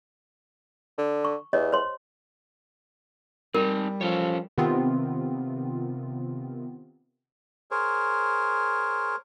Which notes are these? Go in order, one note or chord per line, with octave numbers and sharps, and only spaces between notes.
D3
C#6
E2 G4 C#5 D#5
C5 C#5 C6
G3 C4 D#4 A#4
F3 C#4 A4 C#5
C3 D#3 B3 C4 F4
G#4 A#4 C5 C#5